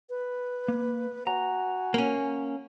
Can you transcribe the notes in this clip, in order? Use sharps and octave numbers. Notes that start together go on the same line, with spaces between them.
B4
A#3
F#4 G#5 A#5
A#3 C#4